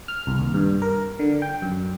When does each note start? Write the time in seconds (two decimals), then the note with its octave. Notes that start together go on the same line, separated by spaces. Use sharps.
0.08 F6
0.27 C2
0.39 D#2
0.54 G2
0.82 A#4
1.19 D3
1.42 G5
1.62 F#2